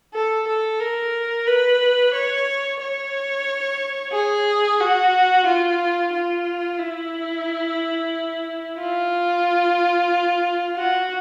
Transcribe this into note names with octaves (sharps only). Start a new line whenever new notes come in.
A4
A4
A#4
B4
C#5
C#5
G#4
F#4
F4
F4
E4
F4
F#4